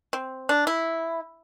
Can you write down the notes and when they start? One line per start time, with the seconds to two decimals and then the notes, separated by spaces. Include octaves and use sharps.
0.13 C4
0.49 D4
0.67 E4